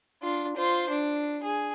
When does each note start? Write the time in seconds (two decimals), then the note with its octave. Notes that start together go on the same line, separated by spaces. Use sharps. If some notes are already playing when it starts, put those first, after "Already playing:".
0.22 D4 F4
0.56 F4 C5
0.90 D4
1.43 G#4